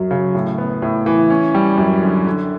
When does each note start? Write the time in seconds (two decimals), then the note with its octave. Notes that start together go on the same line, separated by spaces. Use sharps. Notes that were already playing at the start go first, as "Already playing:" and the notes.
Already playing: F#2 F#3
0.11 C#3
0.35 A2
0.58 B3
0.82 A2
1.06 E3
1.30 C#4
1.54 G3
1.78 F#2
2.02 D3
2.27 D3